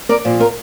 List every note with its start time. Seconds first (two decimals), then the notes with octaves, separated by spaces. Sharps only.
0.09 A#4 D5
0.25 A#2 F3
0.40 F4 A#4